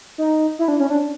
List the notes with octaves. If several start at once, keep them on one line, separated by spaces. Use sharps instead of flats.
D#4
E4
D4
C#4
D4